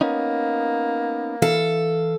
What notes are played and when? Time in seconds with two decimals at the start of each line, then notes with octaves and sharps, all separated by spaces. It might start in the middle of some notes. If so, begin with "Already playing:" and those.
0.01 A#3 B3 C#4 D#4
1.42 E3 E4 A4 F5